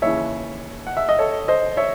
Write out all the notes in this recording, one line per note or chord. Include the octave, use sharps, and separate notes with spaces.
D#2 C#3 E3 C#5 E5
F#5
E5
D#5
A4 C#5
C5 D#5
C#5 E5